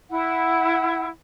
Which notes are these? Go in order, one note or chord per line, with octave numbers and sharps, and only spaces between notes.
E4 F#5